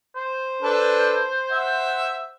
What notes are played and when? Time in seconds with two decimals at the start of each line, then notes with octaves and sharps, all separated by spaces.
0.16 C5
0.62 D4 A4 B4
1.51 E5 F#5